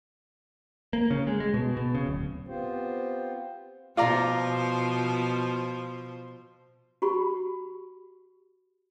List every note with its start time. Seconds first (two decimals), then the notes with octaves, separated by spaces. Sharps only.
0.93 A#3
1.10 C#3
1.27 G#3
1.40 G#3
1.54 B2
1.77 B2
1.95 C#3
2.06 D1
2.48 B3 C4 F4 G4 C5
3.97 B2 F3 F4 C5 D5 A#5
7.02 F#4 G4 B5